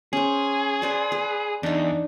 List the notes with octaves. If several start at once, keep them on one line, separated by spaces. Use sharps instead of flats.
C#4 G#4 C5
B4 C5 D5
B4
E2 D4 D#4